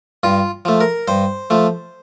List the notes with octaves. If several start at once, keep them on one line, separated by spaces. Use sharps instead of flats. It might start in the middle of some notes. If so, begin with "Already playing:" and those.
G2 F4
F3 A3
A#4
G2 C5
F3 A3